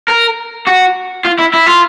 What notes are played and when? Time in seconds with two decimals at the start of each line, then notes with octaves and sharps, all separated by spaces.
0.08 A#4
0.67 F#4
1.25 F4
1.39 E4
1.54 E4
1.66 F4